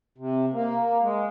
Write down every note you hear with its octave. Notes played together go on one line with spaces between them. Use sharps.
C3
A#3
G#3